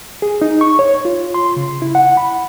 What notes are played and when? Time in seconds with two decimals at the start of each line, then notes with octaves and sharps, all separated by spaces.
0.22 G#4
0.42 D#4
0.61 C#6
0.79 C#5
1.05 F4
1.34 C6
1.57 C#3
1.82 E4
1.95 F#5
2.17 B5